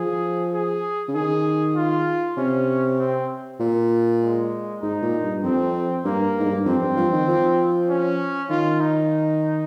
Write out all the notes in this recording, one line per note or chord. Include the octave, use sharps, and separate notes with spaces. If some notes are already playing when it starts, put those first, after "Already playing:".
Already playing: F3 G#4
G#4
C#3
D#3 G#4
F4
C3 C#4
C4
A#2
G#3
G#2 D#4
A#2
G2
F2 C4
G2 A#3
G#2
G2
F2 C4
G2
F3
D#3
F3
C#4
D#3 F4
D#4